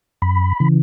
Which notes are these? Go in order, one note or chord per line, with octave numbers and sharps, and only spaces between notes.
F#2 B5
C#3 E3